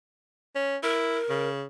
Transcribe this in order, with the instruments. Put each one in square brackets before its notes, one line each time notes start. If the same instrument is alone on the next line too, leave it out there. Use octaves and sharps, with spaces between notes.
[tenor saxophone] C#4
[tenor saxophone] E4 [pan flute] A#4
[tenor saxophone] C#3